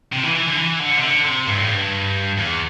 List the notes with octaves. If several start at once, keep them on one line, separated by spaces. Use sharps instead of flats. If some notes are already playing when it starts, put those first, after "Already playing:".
C3
E3
E3
D3
E3
D3
C3
D3
C3
G2
A2
G2
E2